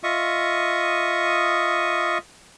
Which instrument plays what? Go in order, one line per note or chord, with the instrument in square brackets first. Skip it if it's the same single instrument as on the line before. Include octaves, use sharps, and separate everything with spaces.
[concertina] F4 D#5 E5 C#6 D#6